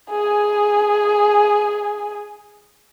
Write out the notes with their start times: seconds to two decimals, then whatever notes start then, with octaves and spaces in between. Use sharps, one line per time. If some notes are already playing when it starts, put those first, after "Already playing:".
0.11 G#4 G#5